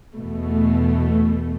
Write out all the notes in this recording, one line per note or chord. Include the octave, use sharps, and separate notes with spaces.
E2 B2 A3